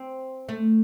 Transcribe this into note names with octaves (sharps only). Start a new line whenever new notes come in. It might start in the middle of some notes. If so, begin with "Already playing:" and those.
Already playing: C4
A3